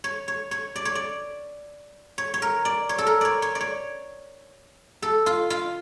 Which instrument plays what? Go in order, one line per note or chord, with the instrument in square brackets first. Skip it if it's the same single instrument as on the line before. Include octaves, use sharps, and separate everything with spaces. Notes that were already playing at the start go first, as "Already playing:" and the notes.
[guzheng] C#5
C#5
C#5
D5
C#5
D5
C#5
C#5
A#4
D5
C#5
A4
A#4
C#5 D5
C#5
D5
C#5
A4
F4
F4